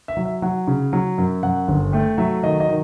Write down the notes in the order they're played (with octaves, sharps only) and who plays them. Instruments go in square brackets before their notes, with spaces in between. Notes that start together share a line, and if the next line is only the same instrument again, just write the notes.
[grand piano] E5
F#3
E5
F#3 F#5
C#3
F#3
F#2
F#2 F#5
G1
A3 G5
F#3 E5
D#3 D#5
D#5
D#3